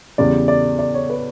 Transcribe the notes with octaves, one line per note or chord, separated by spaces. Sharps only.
E2 C#3 G3 D5
D5
D5
C#5
B4